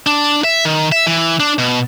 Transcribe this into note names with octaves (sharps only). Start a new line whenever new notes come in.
D4
E5
D#3
E5
E3
D4
B2